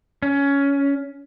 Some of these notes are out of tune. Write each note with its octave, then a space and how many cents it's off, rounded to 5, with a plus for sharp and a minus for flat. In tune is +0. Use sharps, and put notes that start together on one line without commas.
C#4 +15